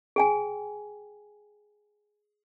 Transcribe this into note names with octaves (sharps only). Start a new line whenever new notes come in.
G#4 G5 G#5